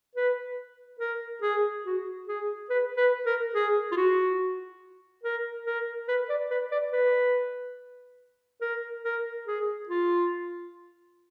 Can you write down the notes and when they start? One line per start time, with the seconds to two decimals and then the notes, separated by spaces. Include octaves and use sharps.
0.15 B4
1.00 A#4
1.42 G#4
1.85 F#4
2.28 G#4
2.70 B4
2.97 B4
3.26 A#4
3.54 G#4
3.92 F4
3.97 F#4
5.24 A#4
5.66 A#4
6.08 B4
6.29 D5
6.51 B4
6.71 D5
6.93 B4
8.62 A#4
9.04 A#4
9.47 G#4
9.89 F4